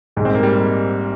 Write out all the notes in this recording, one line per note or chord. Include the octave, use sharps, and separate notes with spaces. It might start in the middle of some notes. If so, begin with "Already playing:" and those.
A#1 G#2 G3 G#3
C4
A#3
G3